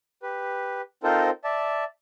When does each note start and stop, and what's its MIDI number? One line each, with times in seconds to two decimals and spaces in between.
0.23 0.81 67
0.23 0.81 71
1.03 1.30 60
1.03 1.30 63
1.03 1.30 65
1.03 1.30 69
1.03 1.30 70
1.03 1.30 72
1.44 1.84 74
1.44 1.84 76
1.44 1.84 81